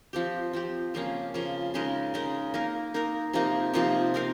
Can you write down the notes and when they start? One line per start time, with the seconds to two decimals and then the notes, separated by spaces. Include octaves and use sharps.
0.13 F3 C4 G4
0.53 F3 C4 G4
0.94 C#3 F3 A#3 C#4
1.34 C#3 F3 A#3 C#4
1.74 C#3 G#3 D#4 A#4
2.14 C#3 G#3 D#4 A#4
2.54 A#3 D#4 A#4
2.94 A#3 D#4 A#4
3.33 C3 F3 A#3 D#4
3.74 C3 F3 A#3 D#4
4.14 C4 D#4 A#4 F5